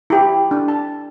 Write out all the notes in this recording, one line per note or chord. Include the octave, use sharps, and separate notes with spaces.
E4 G4
D4
A5